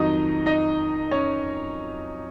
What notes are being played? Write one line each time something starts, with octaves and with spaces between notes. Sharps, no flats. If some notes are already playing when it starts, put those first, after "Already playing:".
Already playing: F2 D#3 F#3 D#4 D#5
D#4 D#5
C#4 C#5